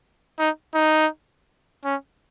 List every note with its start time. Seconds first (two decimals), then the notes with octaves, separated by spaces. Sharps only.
0.39 D#4
0.74 D#4
1.84 C#4